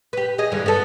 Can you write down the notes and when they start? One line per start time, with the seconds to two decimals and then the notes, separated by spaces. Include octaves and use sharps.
0.13 G4 B4
0.38 G#4 D#5
0.52 E2 G2 D3
0.66 B3 A4